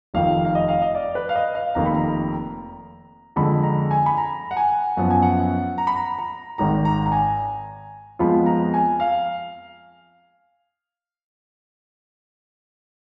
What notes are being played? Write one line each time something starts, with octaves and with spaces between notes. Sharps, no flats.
F1 F2 D#3 F5
F5
D#5
F5
D#5
D5
B4
F5
D#5
F5
F1 F2 D#3 A#3 F4 A#5
B5
A#5
F2 D3 G#3 B5
A#5
G#5
B5
A#5
F#5
G#5
F#2 F3 B3 F#5
G#5
F#5
A#5
B5
A#5
A#5
G#1 G#2 D#3 A#5
A#5
A#5
G#5
F2 F3 G#3 B3 F4 B5
A#5
G#5
F5